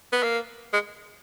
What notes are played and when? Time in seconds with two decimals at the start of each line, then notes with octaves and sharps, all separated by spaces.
0.13 B3
0.23 A#3
0.73 G#3